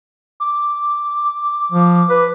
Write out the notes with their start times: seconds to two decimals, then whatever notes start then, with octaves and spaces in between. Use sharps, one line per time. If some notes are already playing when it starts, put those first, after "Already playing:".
0.40 D6
1.72 F3
2.10 B4